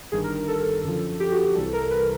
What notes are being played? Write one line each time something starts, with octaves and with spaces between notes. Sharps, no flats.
G1 G2 D#3 G#4
A#4
A#4
A4
F#2 D3 F3
G4
F#4
G4
C2 C3 E3 G3 A4
A#4
B4